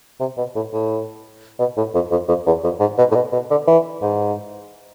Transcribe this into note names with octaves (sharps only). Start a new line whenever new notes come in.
C3
B2
A2
A2
B2
A2
F2
F2
F2
E2
F2
G#2
B2
A2
B2
B2
D3
E3
G#2